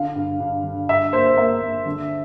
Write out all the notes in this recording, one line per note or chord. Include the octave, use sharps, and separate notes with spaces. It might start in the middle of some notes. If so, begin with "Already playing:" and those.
Already playing: D3 F5
G2
G2
D3
G2 E5
A#3 C5
C5
A#3 E5
A#3
D3